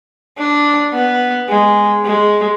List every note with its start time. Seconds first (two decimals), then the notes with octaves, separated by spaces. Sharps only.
0.38 D4
0.94 B3
1.49 G#3
2.05 G#3